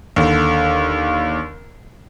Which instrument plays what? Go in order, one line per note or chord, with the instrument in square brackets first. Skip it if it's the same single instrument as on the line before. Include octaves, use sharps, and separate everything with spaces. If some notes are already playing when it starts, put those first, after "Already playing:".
[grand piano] D#2 D3